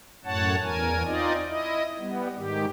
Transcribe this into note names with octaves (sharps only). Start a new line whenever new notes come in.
F#2 A2 C#5 F#5 A5
E2 A#4 G#5
C4 D#4 F4 D5 D#5
E4 D#5
G3 B3
G#2 D#3 G4